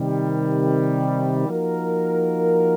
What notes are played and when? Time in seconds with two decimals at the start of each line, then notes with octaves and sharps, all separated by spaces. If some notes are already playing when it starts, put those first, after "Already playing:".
Already playing: C3 D#3 G3
1.47 F3 A#3 D#4 F#4 A#4